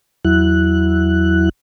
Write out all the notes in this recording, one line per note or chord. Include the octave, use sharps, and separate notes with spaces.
E2 F#3 E4 F#6